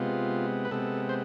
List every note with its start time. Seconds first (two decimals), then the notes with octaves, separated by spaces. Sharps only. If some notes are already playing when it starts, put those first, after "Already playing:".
Already playing: C3 G#3 B3 F4
0.65 B4
0.71 C3 G#3 B3 A4
1.09 C5